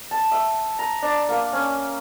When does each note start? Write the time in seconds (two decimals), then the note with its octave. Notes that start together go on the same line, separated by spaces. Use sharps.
0.11 A5
0.32 E5
0.79 A#5
1.02 D4
1.29 A#3
1.53 C#4